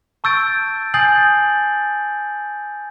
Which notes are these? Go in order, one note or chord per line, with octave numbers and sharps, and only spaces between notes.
A5 C#6 E6 G6 A6 D7
G#5 D#6 G6 A6 C7 F#7